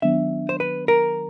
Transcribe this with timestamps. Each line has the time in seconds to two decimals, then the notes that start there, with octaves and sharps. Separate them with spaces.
0.02 D#3 F#3 B3 D4 E5
0.49 C5
0.60 B4
0.88 A#4